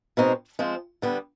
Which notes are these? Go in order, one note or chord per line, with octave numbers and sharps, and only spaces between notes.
B2 G#3 C4 D#4
F3 G#3 C4
D3 G3 B3